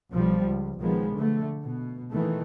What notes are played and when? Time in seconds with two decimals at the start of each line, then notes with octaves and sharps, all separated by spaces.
0.12 B1 F3 G3
0.45 C#2
0.80 B1 D#3 F3 G#3 B3
1.14 D3 A3
1.63 B2
2.12 A#2 D#3 E3 A3